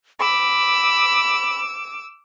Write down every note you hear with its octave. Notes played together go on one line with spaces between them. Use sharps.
B5 D6 E6